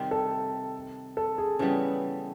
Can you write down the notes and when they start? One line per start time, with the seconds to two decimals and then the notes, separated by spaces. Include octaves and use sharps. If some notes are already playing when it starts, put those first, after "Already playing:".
Already playing: C3 D#3 G3 C4
0.11 A4
1.17 A4
1.38 G#4
1.59 C#3 E3 G3 B3